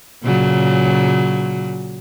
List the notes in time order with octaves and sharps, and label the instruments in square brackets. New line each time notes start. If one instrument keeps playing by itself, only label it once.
[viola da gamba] A#2 C#3 F#3